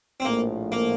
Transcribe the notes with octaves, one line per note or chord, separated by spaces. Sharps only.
C4
A#1 A2 F3 A3 A#3
A#3